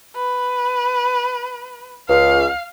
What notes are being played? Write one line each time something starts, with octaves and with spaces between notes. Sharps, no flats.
B4
C#2 F5